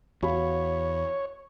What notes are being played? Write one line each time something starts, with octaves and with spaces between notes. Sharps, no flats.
E2 F#4 C#5 F5 B5